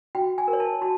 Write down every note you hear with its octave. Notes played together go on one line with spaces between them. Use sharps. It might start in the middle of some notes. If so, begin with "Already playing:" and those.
F#4 G5
G#5
A#4
C#5
A5
F#4 A5